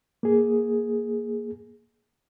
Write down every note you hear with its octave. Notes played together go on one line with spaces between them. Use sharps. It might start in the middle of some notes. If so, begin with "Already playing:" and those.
A#3 G#4